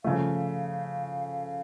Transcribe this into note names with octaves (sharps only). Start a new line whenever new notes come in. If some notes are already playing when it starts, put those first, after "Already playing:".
C#3 F3 A3 F5